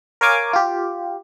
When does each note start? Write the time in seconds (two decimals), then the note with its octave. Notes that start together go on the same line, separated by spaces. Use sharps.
0.21 A#4 C#5 F5 G#5 D6
0.53 F4 G4